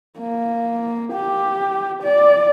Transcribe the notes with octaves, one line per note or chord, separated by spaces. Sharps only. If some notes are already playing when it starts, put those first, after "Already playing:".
A#3
G4
D5